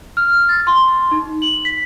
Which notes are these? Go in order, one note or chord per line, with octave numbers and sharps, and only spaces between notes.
F6
A6
C6
D#4
F#7
B6